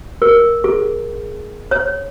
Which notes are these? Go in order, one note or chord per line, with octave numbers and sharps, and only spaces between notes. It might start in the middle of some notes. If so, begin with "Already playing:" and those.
A#4
G#4
C#5